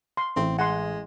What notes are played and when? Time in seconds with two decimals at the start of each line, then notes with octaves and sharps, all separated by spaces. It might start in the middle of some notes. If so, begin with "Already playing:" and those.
0.17 C6
0.36 A1 C4
0.59 G#3 F#5 C6